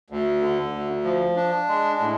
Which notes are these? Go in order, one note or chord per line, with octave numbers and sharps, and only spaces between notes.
D2
D3
D2
F3
D4
G#3
A2